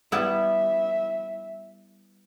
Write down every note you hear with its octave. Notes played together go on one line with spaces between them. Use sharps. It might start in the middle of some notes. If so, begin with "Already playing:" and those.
G3 B3 E4 E5